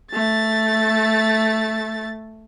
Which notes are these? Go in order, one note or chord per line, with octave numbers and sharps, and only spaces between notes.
A3 A6